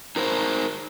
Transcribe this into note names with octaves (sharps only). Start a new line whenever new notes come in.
D#4 A#4 C5